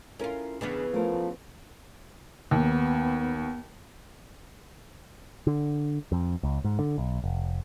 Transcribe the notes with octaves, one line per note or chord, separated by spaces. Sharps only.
C#4 E4 F4 A4 A#4
E2 C#3 E3 B3 D4 B4
F3 A3 A#4
D#2 B3
D3
F2
C#2
G#2
D3
B1
F1